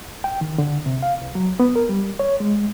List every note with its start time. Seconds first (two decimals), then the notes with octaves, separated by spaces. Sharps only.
0.24 G5
0.41 D#3
0.58 D3
0.86 C3
1.03 F5
1.22 C2
1.35 F#3
1.60 B3
1.76 A#4
1.89 G3
2.19 C#5
2.40 G#3